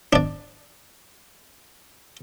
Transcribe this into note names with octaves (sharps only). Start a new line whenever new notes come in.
D4 D5